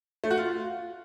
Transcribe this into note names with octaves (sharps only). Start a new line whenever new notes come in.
A3
F#4
F4